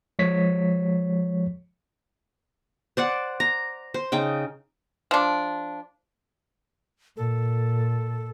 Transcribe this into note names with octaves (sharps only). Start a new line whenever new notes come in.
F3 G#3 C#5 B6
C5 D5 F#5
A#5
C5
C#3 D#4 G5
F3 D4
A#2 A4